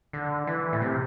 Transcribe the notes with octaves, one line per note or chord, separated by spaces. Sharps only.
D3
E3
A2
C3